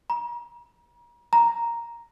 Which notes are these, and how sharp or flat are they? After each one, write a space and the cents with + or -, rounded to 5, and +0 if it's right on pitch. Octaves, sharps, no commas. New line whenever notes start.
A#5 +40
A#5 +0